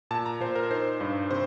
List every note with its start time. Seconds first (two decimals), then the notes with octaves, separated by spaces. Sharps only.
0.11 A#2 A5
0.26 A#5
0.40 A#2 C5
0.55 A#4
0.71 D#4 C5
1.00 G2 C5
1.31 C3 C5